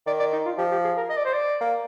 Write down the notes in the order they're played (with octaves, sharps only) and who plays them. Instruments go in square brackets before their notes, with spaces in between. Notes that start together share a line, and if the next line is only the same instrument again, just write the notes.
[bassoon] D#3 [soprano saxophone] D5
[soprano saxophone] D5
D#4
F4
[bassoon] F3 [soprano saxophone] G4
[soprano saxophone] G4
G#4
A#4
D#5
D5
C5
D5
[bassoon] A#3